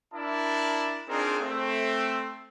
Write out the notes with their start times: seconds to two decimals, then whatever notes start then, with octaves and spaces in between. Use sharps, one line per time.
0.14 D4 E4 A#4 D5 A5
1.09 C4 D4 D#4 F4 G#4 A#4
1.40 A3 C4